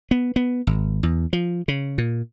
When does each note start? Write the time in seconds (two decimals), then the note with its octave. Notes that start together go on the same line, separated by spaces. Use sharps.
0.11 B3
0.36 B3
0.67 G#1
1.03 E2
1.33 F3
1.68 C#3
1.98 A#2